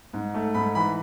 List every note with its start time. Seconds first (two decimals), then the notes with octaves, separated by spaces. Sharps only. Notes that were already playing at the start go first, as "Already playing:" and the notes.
0.13 G#2
0.34 A3
0.54 G#2 B5
0.75 E3 B5